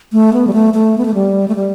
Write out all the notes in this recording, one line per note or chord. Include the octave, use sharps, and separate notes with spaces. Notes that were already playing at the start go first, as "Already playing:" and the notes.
A3
B3
G3
A3
A3
B3
A3
G3
A3
G3